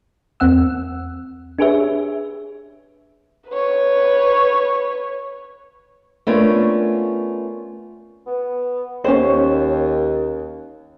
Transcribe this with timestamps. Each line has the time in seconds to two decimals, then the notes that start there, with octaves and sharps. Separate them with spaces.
0.40 E2 C4 F#5 E6
1.59 D4 G4 G#4 B4 C#5 E5
3.49 B4 C#5
6.27 A3 B3 C#4 D4 F4 A#4
8.26 B3
9.04 D#2 C#4 C5